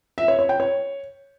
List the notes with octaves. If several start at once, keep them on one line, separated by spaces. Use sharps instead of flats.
E5
C#5
C#5
G5
C#5